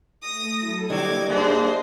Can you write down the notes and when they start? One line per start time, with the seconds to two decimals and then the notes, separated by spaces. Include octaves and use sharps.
0.22 A3 D#6 A#6
0.57 F#3 E4 A4
0.90 D3 G3 A#3 C4 D#5 D6 G#6
1.30 F#2 G#3 D4 D#4 C5